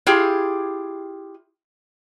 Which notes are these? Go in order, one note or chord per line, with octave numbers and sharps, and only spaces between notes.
E4 F4 G4 G#4